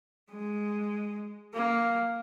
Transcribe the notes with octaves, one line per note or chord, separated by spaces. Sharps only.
G#3
A#3